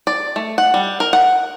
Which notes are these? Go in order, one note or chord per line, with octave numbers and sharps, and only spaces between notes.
D5
A3
F#5
G3
A#4
F#5